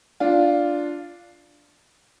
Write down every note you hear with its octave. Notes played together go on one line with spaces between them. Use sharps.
D4 F4